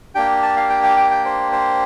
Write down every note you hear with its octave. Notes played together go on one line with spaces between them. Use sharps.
A#3 D4 G4 G5
A5
F5
G5
G5
G5
G5
C5
C5